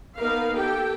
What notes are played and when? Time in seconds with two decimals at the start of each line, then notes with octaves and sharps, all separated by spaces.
0.18 A#3 B3 D#4 A#4 B4 F5
0.55 A#3 G4 A4 G5